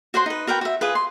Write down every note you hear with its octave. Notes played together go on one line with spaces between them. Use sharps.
F#4 C5 F#5 C6
D#4 B4
F#4 A#4 B4 G5
F#4 E5
F4 G#4 B4
C6